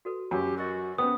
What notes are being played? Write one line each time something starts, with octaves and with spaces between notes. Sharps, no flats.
F#4 A4 B4
F#2 F#4 G4 B4 G#5
F#4 A#4 D#5
B3 C#4 C5 G5 D#6